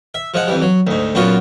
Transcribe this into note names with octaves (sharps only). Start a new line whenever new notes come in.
E5
F3 G#3 F#5
F2 E3 G3
F#3
D2 G#2
F#2 A#2 B3 F4 F#4